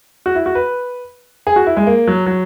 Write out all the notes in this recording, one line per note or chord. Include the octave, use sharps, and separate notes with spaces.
F#4
E4
F#4
B4
G#4
F#4
E4
G#3
A#3
F#3
F#3